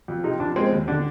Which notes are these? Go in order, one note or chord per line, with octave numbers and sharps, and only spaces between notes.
F2
C3 D#4
F2 D4
G#3 C4
D#2
D3 D4